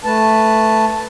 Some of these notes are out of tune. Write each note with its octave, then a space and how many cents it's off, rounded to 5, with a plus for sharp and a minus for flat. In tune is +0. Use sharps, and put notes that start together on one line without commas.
A3 +0 B4 +0 A5 +0